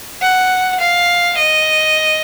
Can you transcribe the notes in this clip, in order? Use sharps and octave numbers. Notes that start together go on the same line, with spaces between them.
F#5
F5
D#5